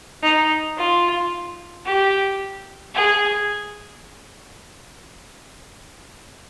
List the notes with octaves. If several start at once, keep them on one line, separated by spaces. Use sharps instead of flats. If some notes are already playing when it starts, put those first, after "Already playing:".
D#4
F4
G4
G#4